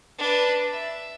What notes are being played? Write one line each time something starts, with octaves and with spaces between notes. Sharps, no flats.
D4 B4
E5